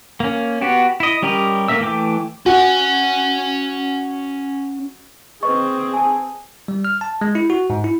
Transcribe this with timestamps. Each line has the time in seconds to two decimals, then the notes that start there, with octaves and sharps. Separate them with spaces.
0.20 A#3 C#4
0.61 B3 F#4 G4
1.00 E4 D#5
1.22 G3 C#4 G4 A#4 D#5
1.68 A3 A#3 A#4 E5 E6
1.80 E3 A3 G5 D6
2.46 C#4 F#4 G#5
5.43 C4 G#4 B4 D#5 C#6
5.93 G#5 A5
6.68 G3
6.85 F6
7.01 A5
7.21 G#3
7.35 E4
7.50 F#4
7.70 G#2
7.84 E4